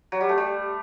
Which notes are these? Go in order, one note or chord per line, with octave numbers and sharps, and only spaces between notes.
F#3
G3
A3
G3